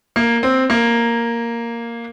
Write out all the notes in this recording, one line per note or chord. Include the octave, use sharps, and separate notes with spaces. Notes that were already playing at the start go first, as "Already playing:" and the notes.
A#3
C4
A#3